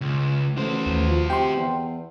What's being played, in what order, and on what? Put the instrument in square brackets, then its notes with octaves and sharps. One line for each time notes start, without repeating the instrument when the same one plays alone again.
[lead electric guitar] C#2
[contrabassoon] A1 [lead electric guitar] F#4 C5
[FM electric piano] D#2
[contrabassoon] F3
[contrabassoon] C3 [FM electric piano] G5 C6
[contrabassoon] E2